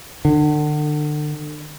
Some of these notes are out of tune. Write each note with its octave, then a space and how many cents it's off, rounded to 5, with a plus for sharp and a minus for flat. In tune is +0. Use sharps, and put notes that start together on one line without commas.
D3 +35